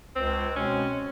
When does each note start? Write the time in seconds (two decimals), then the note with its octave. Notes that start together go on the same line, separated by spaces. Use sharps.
0.16 C#2 C4
0.56 B2 G#3 C4 C#4